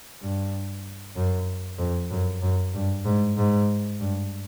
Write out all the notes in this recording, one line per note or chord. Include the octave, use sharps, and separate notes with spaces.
G2
F#2
F2
F#2
F#2
G2
G#2
G#2
G2